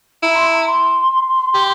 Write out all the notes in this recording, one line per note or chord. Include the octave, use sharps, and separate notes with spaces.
E4 A#5
C6
A#5
C6
G4